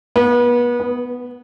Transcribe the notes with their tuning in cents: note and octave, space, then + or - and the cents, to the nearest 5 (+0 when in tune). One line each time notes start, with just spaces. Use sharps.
B3 -30
B3 +0